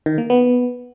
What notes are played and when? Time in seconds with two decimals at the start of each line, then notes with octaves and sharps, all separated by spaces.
0.06 D#3
0.18 A#3
0.30 B3